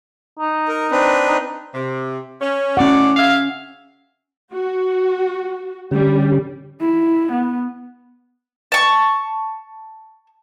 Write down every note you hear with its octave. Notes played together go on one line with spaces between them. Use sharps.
D#4
A#4
C4 D4 B4
D#4
C3
C#4
A2 C#4 F#4 D5 F#5
G#4 E5 F5
F#4
D3 G3 C#4 G4
E4
B3
A5 C#6